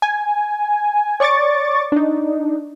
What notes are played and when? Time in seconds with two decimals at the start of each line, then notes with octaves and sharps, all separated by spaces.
0.02 G#5
1.20 C#5 D5 C#6 D6 A6
1.92 D4 D#4